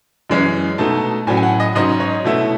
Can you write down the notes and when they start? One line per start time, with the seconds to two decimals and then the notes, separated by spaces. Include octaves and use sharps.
0.30 F#2 E3 G#3 C#4
0.78 B2 A3 D#4 A5
1.27 A2 F#3 C#4 G#5
1.37 G#5
1.43 F#5
1.60 D#5
1.75 G#2 F#3 C#4 D#5
2.00 C#5
2.24 B2 A3 E4